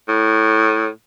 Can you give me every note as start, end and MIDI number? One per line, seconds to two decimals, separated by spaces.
0.08 0.89 45